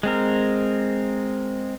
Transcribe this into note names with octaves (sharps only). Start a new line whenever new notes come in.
G#3 C4 A#4